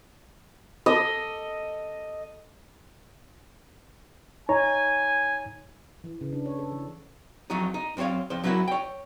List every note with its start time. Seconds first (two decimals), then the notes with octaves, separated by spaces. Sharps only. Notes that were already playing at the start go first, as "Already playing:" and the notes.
0.86 A4 D#5
4.49 D#4 C#5 G#5 A#5
6.04 E3
6.21 C#3
6.33 D4
6.46 C#5
6.59 A4
6.72 E3
7.50 F2 F#3 A3 D#4
7.74 D#4
7.97 F#2 C4 F4 C#5 F5
8.30 F2 C5
8.44 F#3 C#4 D4 E4 F#4 A#4
8.68 C#5 G5